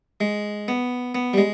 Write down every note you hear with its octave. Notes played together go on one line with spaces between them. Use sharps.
G#3
B3
B3
G3
G#3